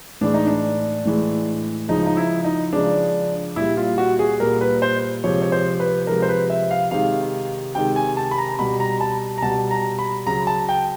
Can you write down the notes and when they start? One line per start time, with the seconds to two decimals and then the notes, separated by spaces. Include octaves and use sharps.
0.21 A2 E3 G#3 D4
0.34 D#4
0.47 D4
1.05 A2 E3 G#3
1.88 C#3 F3 G#3 D#4
2.06 D#4
2.17 E4
2.45 D#4
2.72 C#3 F3 G#3 D4
3.56 A#2 G3 E4
3.77 F4
3.98 F#4
4.19 G#4
4.40 A#2 G3 A#4
4.61 B4
4.82 C5
5.24 C3 F3 G#3 C#5
5.42 C#5
5.52 C5
5.80 B4
6.07 C3 F3 G#3 A#4
6.22 C5
6.29 B4
6.50 E5
6.71 F5
6.91 C3 D#3 G#3 F5
7.75 C3 D#3 G#3 G5
7.96 G#5
8.17 A5
8.31 B5
8.38 A#5
8.59 B2 G3 B5
8.80 A#5
9.01 A5
9.38 A#5
9.42 B2 G3 A5
9.71 A#5
9.99 B5
10.27 C#3 F#3 A#5
10.47 A5
10.69 G5